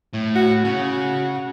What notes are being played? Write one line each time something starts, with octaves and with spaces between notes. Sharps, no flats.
A2
F#4
C#3 F#4